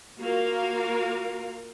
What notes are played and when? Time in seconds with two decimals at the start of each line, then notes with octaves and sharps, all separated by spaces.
0.19 A#3 F4 F#4 A#4 F5